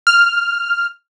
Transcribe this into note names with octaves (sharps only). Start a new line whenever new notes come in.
F6